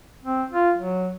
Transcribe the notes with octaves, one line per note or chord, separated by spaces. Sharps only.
C4
F4
F#3